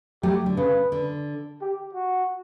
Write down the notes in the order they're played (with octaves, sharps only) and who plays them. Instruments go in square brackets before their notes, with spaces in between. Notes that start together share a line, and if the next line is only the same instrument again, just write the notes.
[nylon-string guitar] F#3 A3 [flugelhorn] G4
[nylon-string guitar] D3
[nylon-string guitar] C#3 [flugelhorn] B4
[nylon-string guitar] D3
[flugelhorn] G4
F#4